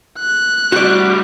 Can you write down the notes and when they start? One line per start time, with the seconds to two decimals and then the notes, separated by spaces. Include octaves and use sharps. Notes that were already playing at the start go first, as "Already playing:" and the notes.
0.20 F#6
0.72 D2 G3 F#4 D5